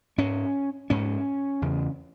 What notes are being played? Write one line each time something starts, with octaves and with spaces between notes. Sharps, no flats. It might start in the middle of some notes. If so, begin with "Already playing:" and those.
G#2 C#4
G#2 C#4
E2 C#3